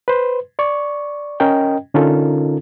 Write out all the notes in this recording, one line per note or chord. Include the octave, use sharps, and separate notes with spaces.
B4 C5
D5 C#6
C#4 A#4 D#5 G5
D3 C#4 D#4 F4 A4 A#4